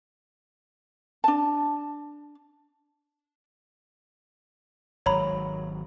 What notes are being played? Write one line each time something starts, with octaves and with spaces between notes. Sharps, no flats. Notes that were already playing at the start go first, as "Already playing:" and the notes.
D4 A5
G#1 F#3 C#5 A#5 B5